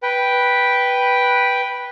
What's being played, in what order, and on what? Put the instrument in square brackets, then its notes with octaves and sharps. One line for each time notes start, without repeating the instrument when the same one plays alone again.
[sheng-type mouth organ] B4 G5